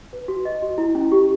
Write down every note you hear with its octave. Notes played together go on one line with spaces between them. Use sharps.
B4
F#4
D#5
F#4
E4
C#4
G4